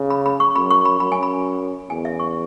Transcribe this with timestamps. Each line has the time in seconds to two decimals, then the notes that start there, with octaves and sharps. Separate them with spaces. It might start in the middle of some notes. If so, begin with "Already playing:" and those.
Already playing: C#3
0.10 B5
0.26 B5
0.40 C#6
0.56 F#2 B5
0.70 C#6
0.85 B5
1.00 F#2 B5
1.12 G#5
1.23 B5
1.89 E2 G#5
2.05 E5
2.19 C#6